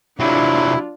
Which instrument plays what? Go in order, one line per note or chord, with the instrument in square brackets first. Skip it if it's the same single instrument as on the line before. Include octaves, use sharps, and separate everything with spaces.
[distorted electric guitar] C3 F#3 [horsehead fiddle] D4 F4 [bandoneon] E4